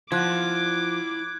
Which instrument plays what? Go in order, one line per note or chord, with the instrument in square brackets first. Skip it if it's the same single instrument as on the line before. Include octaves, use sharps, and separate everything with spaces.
[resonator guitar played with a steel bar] F3 [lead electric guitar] E4 F#5 [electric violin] D6 [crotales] F#6 G#6